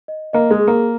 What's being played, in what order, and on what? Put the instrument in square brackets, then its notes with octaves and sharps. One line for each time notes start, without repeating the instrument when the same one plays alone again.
[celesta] D#5
[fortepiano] A#3 [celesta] D#5
[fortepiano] G#3
[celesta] G#4
[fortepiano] A#3